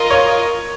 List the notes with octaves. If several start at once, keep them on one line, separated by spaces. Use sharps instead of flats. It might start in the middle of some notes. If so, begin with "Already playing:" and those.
Already playing: F4 A#4 D#5
C#5